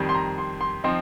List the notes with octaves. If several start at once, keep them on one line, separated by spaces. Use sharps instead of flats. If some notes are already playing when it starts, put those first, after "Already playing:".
Already playing: F2 D#3 G3
C6
A#5
C6
C6
F3 C4 D#4 C6